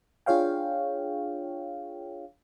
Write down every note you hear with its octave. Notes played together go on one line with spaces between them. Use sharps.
D4 F4 G#4 C#5 F5 G5